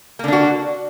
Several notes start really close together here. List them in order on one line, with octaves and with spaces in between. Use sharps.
A#3 D3 D4 F#4